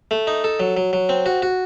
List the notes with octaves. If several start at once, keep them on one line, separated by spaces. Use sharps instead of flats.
A3
D#4
A4
F#3
F#3
F#3
C4
F#4
F#4